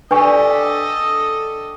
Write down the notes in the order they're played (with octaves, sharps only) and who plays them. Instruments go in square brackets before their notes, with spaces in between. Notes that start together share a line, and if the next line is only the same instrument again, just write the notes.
[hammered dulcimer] D3 G4 [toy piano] D4 [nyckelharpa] A4 D#5 [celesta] B4 G#5 C#6